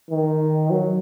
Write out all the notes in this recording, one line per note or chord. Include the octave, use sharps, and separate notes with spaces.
D#3
F#3